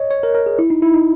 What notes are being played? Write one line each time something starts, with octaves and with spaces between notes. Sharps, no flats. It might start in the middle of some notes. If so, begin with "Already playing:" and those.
Already playing: C#5 D#5
C#5
A#4
A#4
G#4
E4
D#4
E4
D#4